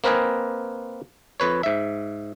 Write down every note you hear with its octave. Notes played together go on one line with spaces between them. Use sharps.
A#3 C4 A#4 B4 D#5 G#5
F2 B4 C#5
G#2 E5